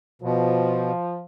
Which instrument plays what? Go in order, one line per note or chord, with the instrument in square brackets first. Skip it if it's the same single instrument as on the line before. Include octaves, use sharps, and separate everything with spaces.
[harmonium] B2 [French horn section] F3